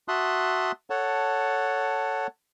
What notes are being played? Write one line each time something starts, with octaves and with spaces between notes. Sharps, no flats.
F#4 E5 A5 C6 D#6 F#6
A4 C#5 F#5 A5